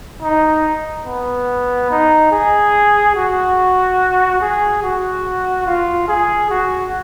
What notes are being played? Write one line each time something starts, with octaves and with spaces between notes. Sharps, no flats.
D#4
B3
D#4
G#4
F#4
G#4
F#4
F4
G#4
F#4